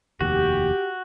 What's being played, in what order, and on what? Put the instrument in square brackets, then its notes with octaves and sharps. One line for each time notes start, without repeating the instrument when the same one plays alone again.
[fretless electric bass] F1 D#2 [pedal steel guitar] F#4 [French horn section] G4